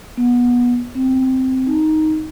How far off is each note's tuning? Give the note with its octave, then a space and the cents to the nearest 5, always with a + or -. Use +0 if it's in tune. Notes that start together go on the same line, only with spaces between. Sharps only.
B3 -20
C4 -5
D#4 +5